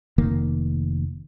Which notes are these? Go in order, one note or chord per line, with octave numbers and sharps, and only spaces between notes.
F1 D#3 A#3